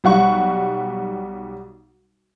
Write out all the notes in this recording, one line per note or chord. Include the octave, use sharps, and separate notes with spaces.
B1 G3 F#5 C#6